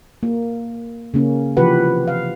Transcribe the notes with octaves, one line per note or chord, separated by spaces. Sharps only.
A#3
C#3 A#3 C#4
C3 E3 F3 G4 B4 F#5
F5